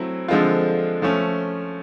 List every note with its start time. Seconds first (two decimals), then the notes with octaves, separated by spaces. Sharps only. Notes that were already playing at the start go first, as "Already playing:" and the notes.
Already playing: F#3 A3 C4 E4
0.28 D3 F3 G#3 C4 F4
1.02 F3 A3 C#4